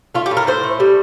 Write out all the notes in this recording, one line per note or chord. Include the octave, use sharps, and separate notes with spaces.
A3 F4
G4
A2
A#4
A2 C5
A3
G3